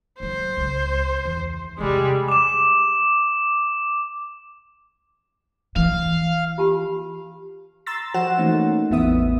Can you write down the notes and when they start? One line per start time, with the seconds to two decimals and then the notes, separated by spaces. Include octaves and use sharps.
0.20 F#3 C4 C5
0.57 C#2
1.25 E2
1.79 E2 C3 G3 G#3
2.28 D6 E7
5.76 E3 F5
6.58 F4 G4 A5
7.86 A#5 C6 E6 A6
8.14 F3 F#4 C5 F#5 E7
8.38 E3 A3 A#3 C#4 D#4
8.90 A1 E2 B3 E4 E5 D#6